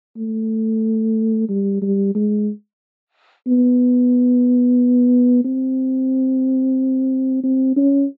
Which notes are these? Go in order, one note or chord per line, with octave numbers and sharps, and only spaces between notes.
A3
G3
G3
G#3
B3
C4
C4
C#4